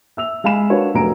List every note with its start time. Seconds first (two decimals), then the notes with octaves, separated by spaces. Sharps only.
0.17 E5 E6 F7
0.44 G#3 F5 G#5 B5 E7
0.70 D4 F#4 A#4 B4 C#5
0.94 F1 F#3 F#4 A#5 D7